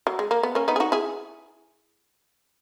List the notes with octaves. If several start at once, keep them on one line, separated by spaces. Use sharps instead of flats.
F#3
G#3
A#3
B3
A#3 C#4
B3 D#4
G#4
D#4 F#4
E4 G#4